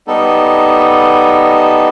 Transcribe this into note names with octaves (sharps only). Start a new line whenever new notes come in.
G3 B3 D#4 A4